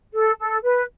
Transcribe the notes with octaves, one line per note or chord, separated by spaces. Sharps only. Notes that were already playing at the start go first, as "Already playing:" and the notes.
A4
A4
B4